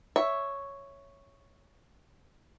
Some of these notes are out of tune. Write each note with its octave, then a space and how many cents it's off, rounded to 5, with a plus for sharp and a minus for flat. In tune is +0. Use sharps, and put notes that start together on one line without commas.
C#5 +0 E5 +0